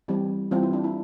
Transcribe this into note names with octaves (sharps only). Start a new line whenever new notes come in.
E3 G3 C4
E3 G3 C4 F4
E4
D4
E4